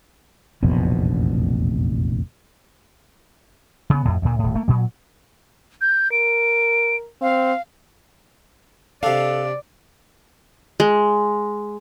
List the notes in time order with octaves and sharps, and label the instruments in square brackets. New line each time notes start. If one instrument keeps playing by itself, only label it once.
[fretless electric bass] F1 A#1 E2 B2
[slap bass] C#3 B3
F2 A2
D2 A#2
D#1 A2
A3 A#3
A#2 F#3
[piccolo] G6
[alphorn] A#4 [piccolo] D7
[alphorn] C4 [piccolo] F5
[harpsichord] C3 D4 [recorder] A4 [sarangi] D5 [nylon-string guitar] F5
[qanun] G#3